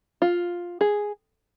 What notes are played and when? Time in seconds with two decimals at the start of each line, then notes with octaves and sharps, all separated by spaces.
0.22 F4
0.81 G#4